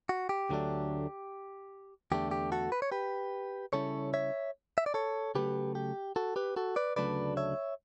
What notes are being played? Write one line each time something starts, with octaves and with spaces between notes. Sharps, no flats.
F#4
G4
D2 D3 F#3 A3 D4
E2 D3 A3 D4 G4
G4
F#4 A4
B4
C#5
G4 B4
C#3 G3 C#4 E4 A4 C#5
C#5 E5
E5
D5
A4 C#5
C#3 F#3 A3 G4 B4
G4
F#4 A4
G4 B4
F#4 A4
B4 D5
D2 C#3 F#3 A3 D4 B4 D5
C#5 E5